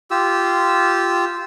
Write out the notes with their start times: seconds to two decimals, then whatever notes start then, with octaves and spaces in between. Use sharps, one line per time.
0.11 F4 G4 E6